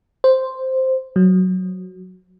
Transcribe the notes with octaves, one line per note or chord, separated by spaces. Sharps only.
C5
F#3